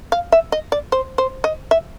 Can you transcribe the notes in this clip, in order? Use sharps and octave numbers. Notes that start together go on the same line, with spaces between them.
F5
E5
D#5
D5
C5
C5
D#5
E5